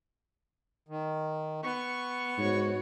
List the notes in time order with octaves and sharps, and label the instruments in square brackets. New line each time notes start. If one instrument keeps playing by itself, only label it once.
[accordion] D#3
[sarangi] B3 [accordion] C#6
[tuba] G#2 [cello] F#4 C#5